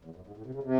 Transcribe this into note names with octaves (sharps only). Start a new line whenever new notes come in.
E2
F#2
G#2
A2
C3
C#3
C3